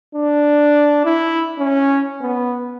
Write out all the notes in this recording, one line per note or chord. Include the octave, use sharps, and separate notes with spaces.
D4
E4
C#4
B3